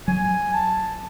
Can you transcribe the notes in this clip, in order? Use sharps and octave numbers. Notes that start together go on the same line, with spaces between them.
F#3 G#5
A5